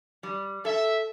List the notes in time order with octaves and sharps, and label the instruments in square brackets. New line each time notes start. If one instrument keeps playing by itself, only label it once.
[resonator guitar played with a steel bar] G3
[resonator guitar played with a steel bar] A4 [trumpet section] E5